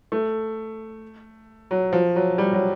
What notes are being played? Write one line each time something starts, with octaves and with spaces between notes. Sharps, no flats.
A3
F#3
F3
F#3
G3
F#3